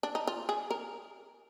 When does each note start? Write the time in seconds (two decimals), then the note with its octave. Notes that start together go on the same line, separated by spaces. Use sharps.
0.03 D4
0.15 D#4
0.27 F4
0.49 G#4
0.71 A#4